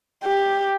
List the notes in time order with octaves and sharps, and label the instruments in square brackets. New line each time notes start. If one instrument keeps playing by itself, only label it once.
[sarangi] G4